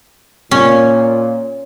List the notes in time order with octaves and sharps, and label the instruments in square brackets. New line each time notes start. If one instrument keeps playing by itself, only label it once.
[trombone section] A#2 [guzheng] C#4